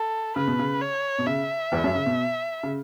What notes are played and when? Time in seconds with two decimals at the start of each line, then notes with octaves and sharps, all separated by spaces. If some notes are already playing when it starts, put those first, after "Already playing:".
Already playing: A4
0.36 C#3 B4
0.47 B2
0.59 C#3
0.81 C#5
1.18 B2
1.26 C#3 E5
1.72 E2 E3
1.84 F#2 F#3
1.95 C#3
2.06 B2
2.63 C#3